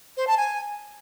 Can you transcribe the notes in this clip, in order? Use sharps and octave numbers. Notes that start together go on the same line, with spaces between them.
C5
A5
G#5